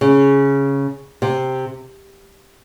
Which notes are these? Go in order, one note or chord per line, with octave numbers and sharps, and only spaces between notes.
C#3
C3